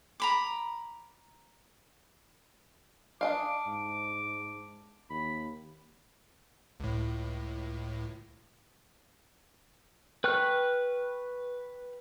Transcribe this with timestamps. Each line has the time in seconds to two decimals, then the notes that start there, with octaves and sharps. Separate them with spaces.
0.20 A#5 B5 D6
3.21 D4 D#5 F5 D6
3.66 G#2
5.10 D#2 B5
6.80 C#2 A2
10.24 B4 G5 C#6 F6 F#6